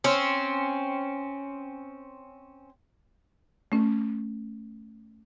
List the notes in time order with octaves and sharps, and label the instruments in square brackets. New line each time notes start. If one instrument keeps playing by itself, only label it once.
[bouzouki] C4 C#4
[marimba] A3 C#4